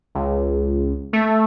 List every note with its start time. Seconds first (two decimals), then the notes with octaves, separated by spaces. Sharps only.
0.15 C#2
1.13 A3